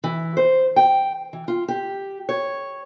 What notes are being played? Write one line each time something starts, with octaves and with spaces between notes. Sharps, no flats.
E3
C5
G5
E3
F4
G4
C#5